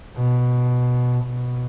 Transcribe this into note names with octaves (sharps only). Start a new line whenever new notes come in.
B2
B2